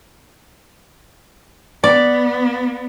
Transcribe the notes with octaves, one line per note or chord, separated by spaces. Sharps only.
B3 D5